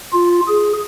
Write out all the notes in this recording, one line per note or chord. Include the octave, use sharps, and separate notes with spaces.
F4
G#4